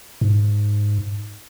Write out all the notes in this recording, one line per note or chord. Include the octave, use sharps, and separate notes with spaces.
G#2